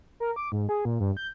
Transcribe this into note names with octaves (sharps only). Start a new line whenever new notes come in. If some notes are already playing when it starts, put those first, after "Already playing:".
A#4
D6
G#2
G#4
A#2
G2
G6